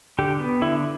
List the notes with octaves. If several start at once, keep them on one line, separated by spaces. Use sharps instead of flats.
D3 G4
B3
D3 E4